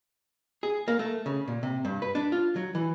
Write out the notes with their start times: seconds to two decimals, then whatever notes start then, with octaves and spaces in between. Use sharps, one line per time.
0.63 G#4
0.88 A#3
0.99 A3
1.26 C#3
1.48 A#2
1.63 C3
1.85 G2
2.02 B4
2.15 D4
2.32 F4
2.56 F#3
2.75 E3